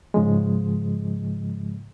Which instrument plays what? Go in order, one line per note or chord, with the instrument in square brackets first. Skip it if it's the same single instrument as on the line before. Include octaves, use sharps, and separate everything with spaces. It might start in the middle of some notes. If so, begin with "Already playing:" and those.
[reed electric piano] G#2 C#3 F3 G#3